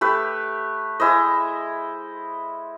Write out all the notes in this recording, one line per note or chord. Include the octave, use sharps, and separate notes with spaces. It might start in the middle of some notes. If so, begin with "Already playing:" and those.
A3 G4 B4
G#3 E4 C5 D#5